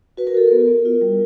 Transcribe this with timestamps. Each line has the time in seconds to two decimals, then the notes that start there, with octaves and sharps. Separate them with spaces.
0.17 F#4 B4
0.27 A#4
0.35 F#4 A4
0.47 B3 A#4
0.68 B3
0.85 F4
1.01 G3